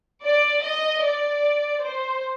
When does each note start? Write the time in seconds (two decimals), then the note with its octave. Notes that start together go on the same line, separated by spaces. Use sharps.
0.23 D5
0.63 D#5
1.04 D5
1.84 C5